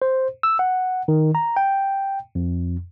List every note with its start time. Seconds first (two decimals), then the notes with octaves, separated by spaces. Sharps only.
0.02 C5
0.43 E6
0.59 F#5
1.08 D#3
1.35 A#5
1.57 G5
2.35 F2